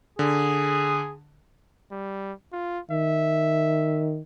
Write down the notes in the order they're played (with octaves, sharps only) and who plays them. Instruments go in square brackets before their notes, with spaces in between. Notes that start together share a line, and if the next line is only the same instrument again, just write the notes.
[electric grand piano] D3 [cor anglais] G#4
[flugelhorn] G3
F4
[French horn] D#3 [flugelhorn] E5